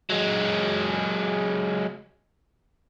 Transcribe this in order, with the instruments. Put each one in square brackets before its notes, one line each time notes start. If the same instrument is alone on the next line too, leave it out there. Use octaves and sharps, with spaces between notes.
[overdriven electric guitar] F#3 G#3